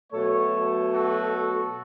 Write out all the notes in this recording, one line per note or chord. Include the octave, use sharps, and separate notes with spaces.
B2 F#3 A3 A4 C#5
F#4 A4